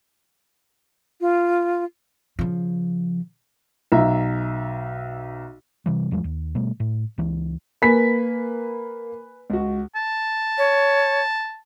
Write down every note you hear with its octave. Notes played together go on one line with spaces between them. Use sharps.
F4
C#3 F3
B1 E5 A#5
C3 E3 G3
E2 F3 G3 G#3
D#2
B2 G3 A3
A2
C#2 E3
A#3 B4 G#5 B5 B6
C#2 F#4
A5
C#5